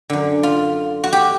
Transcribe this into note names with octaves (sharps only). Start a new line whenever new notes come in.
F#2 D3
F4
F#4
G4